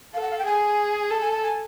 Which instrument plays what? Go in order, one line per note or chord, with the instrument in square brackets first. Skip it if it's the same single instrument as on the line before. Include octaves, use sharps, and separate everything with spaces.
[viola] A4 [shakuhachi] F5
[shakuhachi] F#5
F5
G5
[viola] G#4 [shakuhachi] G#5
[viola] A4 [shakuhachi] A5
[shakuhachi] G#5
A5
G#5